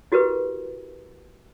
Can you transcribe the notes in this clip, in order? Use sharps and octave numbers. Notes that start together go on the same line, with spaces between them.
E4 F#4 G4 A#4 B4